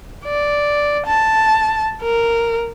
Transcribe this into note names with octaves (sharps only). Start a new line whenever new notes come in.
D5
A5
A#4